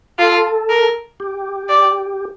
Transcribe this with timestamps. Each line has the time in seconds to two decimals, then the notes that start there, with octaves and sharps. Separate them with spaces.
0.19 F4 A4
0.70 A#4
1.20 G4
1.69 D5